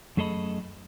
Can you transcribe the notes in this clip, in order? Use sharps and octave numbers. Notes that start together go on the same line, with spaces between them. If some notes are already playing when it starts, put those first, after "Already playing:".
F#2 A3 G#4 A4 D#5 B5